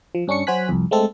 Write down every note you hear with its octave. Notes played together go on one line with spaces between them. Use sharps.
F3
G2 C#4 D4 C#6 C#7
F#3 F#4 C5 G#5 F#6 B6
C2 F2
G#3 A3 C4 A4